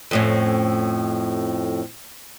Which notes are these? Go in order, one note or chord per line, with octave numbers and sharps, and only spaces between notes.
F2 A2 C#4